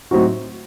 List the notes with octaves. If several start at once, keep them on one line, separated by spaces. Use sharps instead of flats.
A2 F#3 C4 D#4 F#4